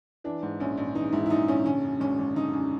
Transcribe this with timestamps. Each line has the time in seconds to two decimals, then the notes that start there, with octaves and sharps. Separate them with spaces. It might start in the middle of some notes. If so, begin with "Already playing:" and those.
0.24 E3 D4
0.43 G#2
0.60 A#1 C#4
0.77 A#1
0.95 E3 D#4
1.12 G#2 E4
1.26 E4
1.30 A#1 D#4
1.48 A#1 C#4
1.66 D3 C#4
1.84 F#2
2.00 G#1 C#4
2.18 G#1
2.35 D3 D#4
2.53 F#2